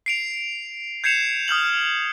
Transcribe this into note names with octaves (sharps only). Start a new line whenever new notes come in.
C7 D7 F7
G6 G#6 C7 C#7 E7 F7
D#6 F6 G6 F#7